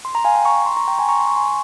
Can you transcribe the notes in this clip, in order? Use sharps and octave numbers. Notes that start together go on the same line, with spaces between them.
C6
A#5
F5 G#5
G5 A#5
A#5 C#6
C#6
C6
A#5 C#6
G5 A#5
G#5 C6
A#5 C#6
C6
C#6
G#5 C6